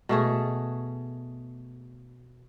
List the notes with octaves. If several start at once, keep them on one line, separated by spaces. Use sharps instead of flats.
B2 A3 G#4